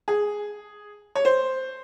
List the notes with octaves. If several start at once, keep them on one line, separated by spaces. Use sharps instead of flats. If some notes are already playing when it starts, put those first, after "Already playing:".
G#4
C#5
C5